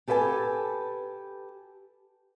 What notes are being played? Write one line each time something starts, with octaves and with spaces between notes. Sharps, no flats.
G4 A4 B4 E5 G#5 A5